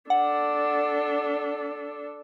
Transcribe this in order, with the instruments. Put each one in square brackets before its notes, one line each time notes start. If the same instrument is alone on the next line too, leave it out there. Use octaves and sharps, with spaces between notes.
[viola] D4 A4 [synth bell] F#5